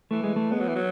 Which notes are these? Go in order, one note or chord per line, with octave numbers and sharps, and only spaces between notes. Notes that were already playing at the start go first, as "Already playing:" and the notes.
E3 A3
G#3
A3
G#3 B3
F#3
E3
F#3